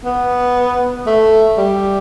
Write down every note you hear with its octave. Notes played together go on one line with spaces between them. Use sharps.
B3
A3
G3